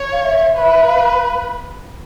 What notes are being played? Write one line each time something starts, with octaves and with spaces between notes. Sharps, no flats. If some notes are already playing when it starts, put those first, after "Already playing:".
Already playing: C#5
F5
E5
B4 E5
F5